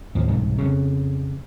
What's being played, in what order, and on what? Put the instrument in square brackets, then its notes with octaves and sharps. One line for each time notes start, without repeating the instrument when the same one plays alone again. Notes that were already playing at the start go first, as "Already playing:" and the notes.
[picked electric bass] A1 D#2 F3
E1 C2 G#2
F2 C#3